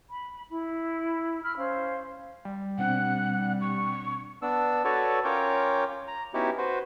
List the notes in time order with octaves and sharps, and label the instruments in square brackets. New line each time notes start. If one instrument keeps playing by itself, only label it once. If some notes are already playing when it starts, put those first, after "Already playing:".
[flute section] B5
E4
B5 E6 F6
C#4 C5 F5
[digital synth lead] G3
[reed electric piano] B2 C4 D4 [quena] F#5
[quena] C#6
[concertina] B3 D4 E6
F#4 A4 B4 C#5 D5
C#4 F4 A#4 C#5 G5 D6
A#5
B3 C#4 D#4 E4 F#4 G4
F#4 B4 C5